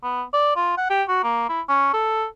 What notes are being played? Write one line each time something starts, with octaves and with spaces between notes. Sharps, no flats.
B3
D5
F4
F#5
G4
F#4
A#3
E4
C#4
A4